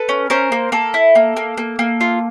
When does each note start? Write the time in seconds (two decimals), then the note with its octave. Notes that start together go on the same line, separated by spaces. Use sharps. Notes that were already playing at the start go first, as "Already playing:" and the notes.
Already playing: A4 B4
0.09 C#4
0.30 C#4 A#4 C5
0.52 A#3
0.72 A#3 A4
0.94 E4
1.15 A#3
1.37 A#3
1.58 A#3
1.79 A#3
2.01 F4